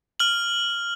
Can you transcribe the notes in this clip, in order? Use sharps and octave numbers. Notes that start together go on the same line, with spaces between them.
F6 F#7